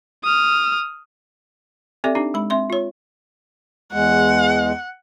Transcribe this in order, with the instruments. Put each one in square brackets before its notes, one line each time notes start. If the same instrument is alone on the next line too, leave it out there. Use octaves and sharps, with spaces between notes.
[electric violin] D#6 F6
[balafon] C4 G4 A4 D5 E5
D4 D#4 G4
G#3 B5
C4 E5 C6
F4 C#5
[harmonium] E2 G#3 [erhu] F#5